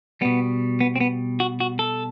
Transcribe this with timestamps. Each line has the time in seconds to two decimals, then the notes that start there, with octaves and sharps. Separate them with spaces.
0.21 B2 G3 B3
0.81 B3
0.96 C4
1.01 B3
1.40 F#4
1.60 F#4
1.79 A4